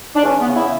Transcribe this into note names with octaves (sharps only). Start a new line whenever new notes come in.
D4
E2 C#4
B3
C#3
E4